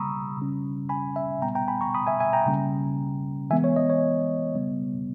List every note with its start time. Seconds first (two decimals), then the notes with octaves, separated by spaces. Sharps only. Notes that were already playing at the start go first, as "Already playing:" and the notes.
Already playing: C#3 G3 A#3 A#5 B5 C#6 D#6 E6
0.38 C#3 G3 C#4
0.89 G#5 B5
1.16 E5 G#5
1.42 A#2 G3 B3 G5 A#5
1.55 G5 A#5
1.68 G#5 B5
1.81 A#5 C#6
1.94 B5 D#6
2.07 E5 G#5
2.20 E5 G#5
2.33 G5 A#5
2.46 C#3 G3 A#3 C#4
3.50 E3 G#3 B3 E5 G#5
3.64 C#5
3.76 D#5
3.90 C#5
4.55 C#3 G3 B3